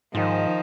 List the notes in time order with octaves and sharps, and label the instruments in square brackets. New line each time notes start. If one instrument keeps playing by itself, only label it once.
[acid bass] G#2 [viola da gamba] D#3 F3